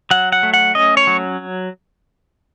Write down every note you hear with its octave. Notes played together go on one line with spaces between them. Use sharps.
F#3 F#5
F#5
A3
F#5
C#4 D#5
C#5
F#3